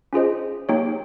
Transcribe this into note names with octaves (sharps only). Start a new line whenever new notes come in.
C#4 F4 G#4 C5 D#5
A#3 D#4 G4 C#5 G5